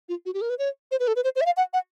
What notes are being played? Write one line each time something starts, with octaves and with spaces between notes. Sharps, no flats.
F4
F#4
G4
A#4
B4
C#5
C5
B4
A4
B4
C5
C5
E5
F5
F#5
F#5